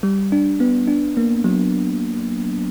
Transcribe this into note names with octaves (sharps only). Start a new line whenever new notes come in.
G3
D4
B3
D4
A#3
F#3